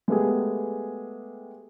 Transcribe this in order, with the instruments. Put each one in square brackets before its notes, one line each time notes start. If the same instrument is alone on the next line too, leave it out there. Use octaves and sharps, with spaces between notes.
[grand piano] G#3 A3 B3 G4 G#4